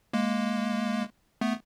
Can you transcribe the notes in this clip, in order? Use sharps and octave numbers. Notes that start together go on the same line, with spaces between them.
G#3 A#3
A3 B3